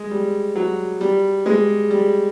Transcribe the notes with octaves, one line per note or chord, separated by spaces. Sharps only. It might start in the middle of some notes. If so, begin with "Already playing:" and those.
Already playing: G#3
G3
F#3
G3
G#3
G3